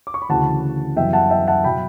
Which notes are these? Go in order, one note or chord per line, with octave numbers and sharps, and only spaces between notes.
D6
C#6
B5
D2 C#3 E3 F#5 A5
F#2 E3 G3 B3 E5 G5
F#5 A5
E5 G5
F#5 A5
B2 F#3 G5 B5